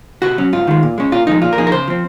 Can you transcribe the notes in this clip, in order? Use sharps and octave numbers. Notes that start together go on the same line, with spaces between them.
C3 F#4
F#3 C#4
G#2 F4
D#3 G#3
A#2
G#3 C#4
A#2 F4
F3 G#3 D#4
A#2 F4
A#4
F3 A#3 D#4 G#4
A#4
C#3 C5
F3 C4